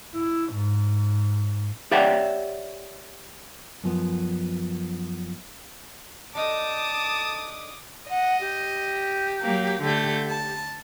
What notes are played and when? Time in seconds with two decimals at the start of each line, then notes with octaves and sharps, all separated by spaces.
0.14 E4
0.52 G#2
1.91 G4 C#5 D5 E5 F#5 G5
3.84 F#2 F3 B3
6.35 D4 D#4 A4 A5 D6 D#6
8.10 D#5 F#5
8.40 G4
9.42 F#3 A#3
9.83 D3 A3 G6
10.28 A5